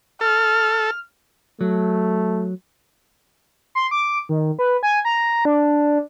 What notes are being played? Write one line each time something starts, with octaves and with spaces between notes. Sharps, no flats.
A4 F6
F#3 A3
C6
D6
D#3
B4
G#5
A#5
D4